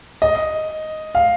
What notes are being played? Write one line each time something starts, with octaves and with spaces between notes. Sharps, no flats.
D#5
F5